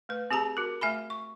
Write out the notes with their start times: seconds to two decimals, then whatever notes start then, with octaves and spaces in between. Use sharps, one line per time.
0.09 A3 B4
0.31 C4 G4 G#4 A5 A#5
0.57 F#4 A#4
0.81 A3 E5 G#5 B5
1.10 C#6